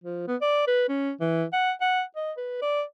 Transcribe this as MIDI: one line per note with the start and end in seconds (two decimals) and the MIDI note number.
0.04 0.26 53
0.28 0.36 59
0.42 0.65 74
0.67 0.87 71
0.89 1.12 61
1.20 1.44 52
1.53 1.72 78
1.81 2.03 78
2.16 2.32 75
2.37 2.57 71
2.62 2.83 74